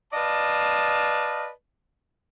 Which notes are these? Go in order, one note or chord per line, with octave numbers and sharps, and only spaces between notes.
B4 D5 D#5 F5 A5